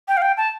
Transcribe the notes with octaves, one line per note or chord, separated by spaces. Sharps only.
G5
F5
G5
A5